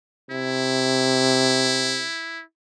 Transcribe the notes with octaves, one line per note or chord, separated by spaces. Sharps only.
C3 E4